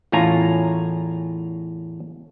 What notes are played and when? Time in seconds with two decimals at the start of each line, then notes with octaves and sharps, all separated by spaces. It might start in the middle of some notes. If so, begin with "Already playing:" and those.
0.12 E2 A2 C#4 F4 G#5 A#5